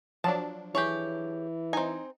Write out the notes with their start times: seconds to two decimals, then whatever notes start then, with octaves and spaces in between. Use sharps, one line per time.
0.24 F3 F#3 D4 A5
0.75 E3 G4 G#4 C#5
1.73 C4 D#4 G#5